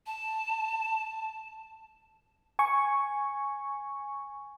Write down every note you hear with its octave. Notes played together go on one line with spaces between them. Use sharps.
A5
G#5 C#6